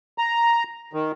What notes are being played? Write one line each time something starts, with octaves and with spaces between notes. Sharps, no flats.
A#5
D#3